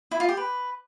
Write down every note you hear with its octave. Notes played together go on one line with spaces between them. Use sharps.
E4
F4
G4
B4